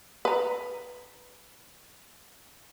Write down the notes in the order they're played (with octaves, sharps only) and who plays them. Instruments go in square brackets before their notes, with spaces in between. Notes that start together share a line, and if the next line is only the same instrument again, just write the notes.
[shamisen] B4 A#5